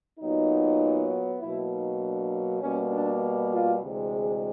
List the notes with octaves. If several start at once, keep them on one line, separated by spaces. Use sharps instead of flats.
A#2 F#3 B3 D#4
B2 F#3 A#3 E4
D#4
D4
B2 G3 A#3 C#4
D4
F4
D2 C3 E3 G#3
G#4